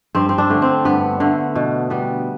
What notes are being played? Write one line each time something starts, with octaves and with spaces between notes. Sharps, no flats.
G2 C4
C4
D4
D3 A3
C4
G2 B3
D3 A3
B2
G3 B3